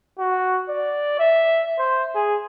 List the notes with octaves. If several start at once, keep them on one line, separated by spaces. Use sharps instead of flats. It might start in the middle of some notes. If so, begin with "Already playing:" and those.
F#4
D5
E5
C5
G#4